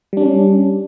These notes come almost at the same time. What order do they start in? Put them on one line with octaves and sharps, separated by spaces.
G3 D4 C#4